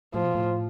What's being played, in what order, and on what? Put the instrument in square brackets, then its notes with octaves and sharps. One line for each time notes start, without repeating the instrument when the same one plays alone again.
[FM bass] A2 [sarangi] F3
[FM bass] B2
A2